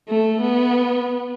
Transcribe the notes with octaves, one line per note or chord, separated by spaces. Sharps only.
A3
B3